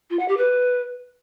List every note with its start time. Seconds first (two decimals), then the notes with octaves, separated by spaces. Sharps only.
0.10 F4
0.19 F#5
0.28 G4
0.37 B4